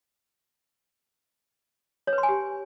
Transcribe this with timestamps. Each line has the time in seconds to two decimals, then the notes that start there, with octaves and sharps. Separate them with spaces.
2.07 C#5
2.13 B4
2.18 C6
2.23 G#5
2.29 G4